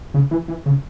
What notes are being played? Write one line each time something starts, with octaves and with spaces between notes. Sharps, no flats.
C#3
E3
E3
C#3